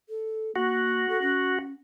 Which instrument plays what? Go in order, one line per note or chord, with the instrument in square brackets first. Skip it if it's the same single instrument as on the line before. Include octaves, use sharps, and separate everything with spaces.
[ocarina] A4
[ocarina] A#3 [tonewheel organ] F#4
[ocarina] A4
C#4